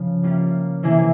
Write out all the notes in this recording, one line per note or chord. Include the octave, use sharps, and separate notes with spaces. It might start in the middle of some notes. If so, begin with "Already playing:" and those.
Already playing: C#3 F3
G3 A#3 C#4 F4
C3 E3 A#3 E4 G#4